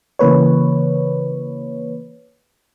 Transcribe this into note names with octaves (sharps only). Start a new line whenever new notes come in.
C#3 E3 A#3 B4 C#5